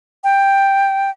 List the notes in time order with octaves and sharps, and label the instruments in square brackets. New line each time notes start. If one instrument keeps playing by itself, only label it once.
[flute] G5